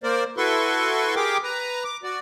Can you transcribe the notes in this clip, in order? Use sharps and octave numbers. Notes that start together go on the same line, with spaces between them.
A#3 A#4 C5 D5
E4 F#4 A4 B4 C6 C#6
G4 G#4 A#4 G5 D6
B4 A#5
D6
F#4 D5